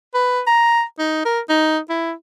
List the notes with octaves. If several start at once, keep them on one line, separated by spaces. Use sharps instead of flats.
B4
A#5
D#4
A#4
D#4
E4